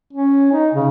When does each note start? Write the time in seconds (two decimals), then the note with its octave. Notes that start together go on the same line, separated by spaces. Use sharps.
0.13 C#4
0.52 D#4
0.75 C#3